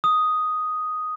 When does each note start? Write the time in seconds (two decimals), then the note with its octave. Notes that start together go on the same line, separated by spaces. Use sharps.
0.04 D#6